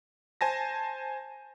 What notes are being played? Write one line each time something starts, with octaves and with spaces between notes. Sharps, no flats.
C5 G#5 A5 A#6